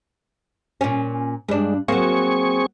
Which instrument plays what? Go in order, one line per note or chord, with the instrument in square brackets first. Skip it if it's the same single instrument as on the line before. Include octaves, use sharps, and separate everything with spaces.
[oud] A#2 C#4
[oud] G2 D4 [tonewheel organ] G#3
[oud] F#3 A#3 [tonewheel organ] C4 G#4 C#6